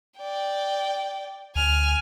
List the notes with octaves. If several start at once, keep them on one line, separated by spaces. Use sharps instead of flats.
D5 G5
D2 G#5 F6